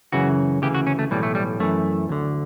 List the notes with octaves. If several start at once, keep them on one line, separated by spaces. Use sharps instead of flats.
F#2 C#3 E3 F#4
D2 C#3 E3 G4
F#4
C#4
A3
B1 A2 E3 G3
A3
G3
F#2 E3 A3
D2 D3